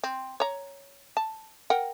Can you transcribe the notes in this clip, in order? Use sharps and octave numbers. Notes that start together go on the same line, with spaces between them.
C4
C#5 A#5
A5
A#4 F#5 G5